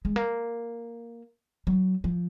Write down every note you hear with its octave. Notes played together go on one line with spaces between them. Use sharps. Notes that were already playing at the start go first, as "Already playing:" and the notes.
G#3
A#3
F#3
F3